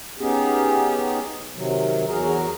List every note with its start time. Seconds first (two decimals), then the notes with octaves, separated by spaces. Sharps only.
0.19 B3 C#4 D#4 G4 G#4
1.55 C3 D#3 F#3
2.08 E2 F#3 F#4 G#4 A#4 A#5